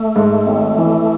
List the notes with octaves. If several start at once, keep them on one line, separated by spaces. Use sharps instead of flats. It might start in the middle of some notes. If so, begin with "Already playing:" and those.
Already playing: A3
G#2
G#1
E3